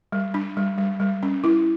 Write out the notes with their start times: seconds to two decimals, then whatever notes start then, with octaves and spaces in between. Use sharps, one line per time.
0.12 G3
0.34 D4
0.57 G3
0.78 G3
1.00 G3
1.23 C#4
1.44 E4